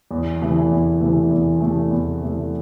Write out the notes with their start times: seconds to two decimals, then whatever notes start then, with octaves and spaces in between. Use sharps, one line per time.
0.11 E2
0.42 C3 E3 A3
0.71 E2
1.01 C3 E3 A3
1.31 E2
1.61 C3 E3 A3
1.91 E2
2.20 C3 E3 A3